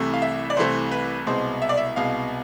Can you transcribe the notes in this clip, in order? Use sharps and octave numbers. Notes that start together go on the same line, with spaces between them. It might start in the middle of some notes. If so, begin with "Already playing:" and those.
Already playing: C2 C3 E3 A3
F5
E5
D5
C2 C3 E3 A3 C5
B4
C2 B2 G#3 C5
E5
D5
E5
C2 B2 G#3 F5